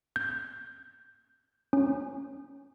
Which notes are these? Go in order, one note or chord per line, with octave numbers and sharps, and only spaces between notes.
G6
C#4